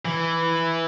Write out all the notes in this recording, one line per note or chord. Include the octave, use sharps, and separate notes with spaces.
E3